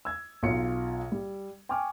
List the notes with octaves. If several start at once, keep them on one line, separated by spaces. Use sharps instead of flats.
E6 G#6
B1 F4 C#7
G3
G5 G#5 C#6 D6 F6